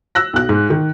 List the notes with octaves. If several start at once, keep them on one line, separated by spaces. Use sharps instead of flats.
E6 F#6 A#6
B1 F#6
G#2
D#3